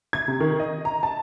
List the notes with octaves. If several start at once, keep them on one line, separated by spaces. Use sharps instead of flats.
G#6
C3
D#3
D#5
A#5
A5